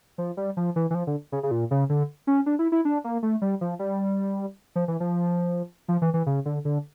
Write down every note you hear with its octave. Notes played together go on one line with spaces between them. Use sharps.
F3
G3
F3
E3
E3
F3
D3
C#3
C#3
A#2
C#3
D3
C#4
D4
E4
E4
D4
A#3
A3
G3
F3
G3
F3
E3
F3
F3
E3
E3
C#3
D3
D3